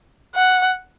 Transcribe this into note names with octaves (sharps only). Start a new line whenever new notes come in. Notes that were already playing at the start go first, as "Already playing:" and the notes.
F#5